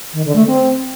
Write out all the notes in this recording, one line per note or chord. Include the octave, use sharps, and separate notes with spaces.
D#3
D3
A3
C4